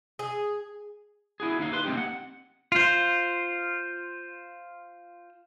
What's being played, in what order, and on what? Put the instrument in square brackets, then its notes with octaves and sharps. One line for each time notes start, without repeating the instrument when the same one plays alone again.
[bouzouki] G#4
[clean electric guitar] E4 F#4 G#4
D#2 D#4 F5
G4 B4 C6
A#3 C4 C#4 D#4 G4
F#5
[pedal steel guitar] F4 C5